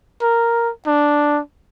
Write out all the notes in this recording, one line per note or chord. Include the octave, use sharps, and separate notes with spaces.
A#4
D4